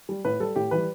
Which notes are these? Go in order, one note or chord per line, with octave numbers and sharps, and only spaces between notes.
G3
A2 B4
G3 A4
A2 G4
E3 G3 B4